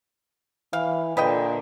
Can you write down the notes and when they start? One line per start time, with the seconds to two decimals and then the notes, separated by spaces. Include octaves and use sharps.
0.73 E3 F5
1.17 A#2 D3 B4 D#5 G5